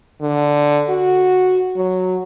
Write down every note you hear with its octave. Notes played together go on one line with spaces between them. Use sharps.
D3
F#4
F#3